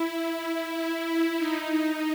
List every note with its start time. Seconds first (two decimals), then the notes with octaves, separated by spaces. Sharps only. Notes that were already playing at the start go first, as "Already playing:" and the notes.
Already playing: E4
0.35 E4
0.68 E4
1.38 D#4